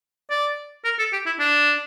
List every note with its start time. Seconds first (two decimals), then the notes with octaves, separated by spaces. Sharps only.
0.30 D5
0.85 A#4
0.99 A4
1.13 G4
1.26 E4
1.39 D4